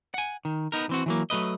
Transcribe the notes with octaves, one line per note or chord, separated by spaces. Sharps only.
F#5 G#5
D#3
B3 D#4 A#4
E3 C4 F#4
E3 F#3 A#3
F#3 A3 B4 D#5